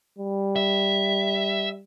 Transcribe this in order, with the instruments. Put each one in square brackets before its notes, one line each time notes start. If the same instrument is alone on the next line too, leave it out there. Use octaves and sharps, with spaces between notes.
[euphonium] G3
[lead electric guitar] E5